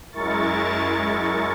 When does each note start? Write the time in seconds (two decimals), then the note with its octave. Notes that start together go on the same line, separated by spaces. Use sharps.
0.12 F#2 G#3 E4 A#4 C#6 A6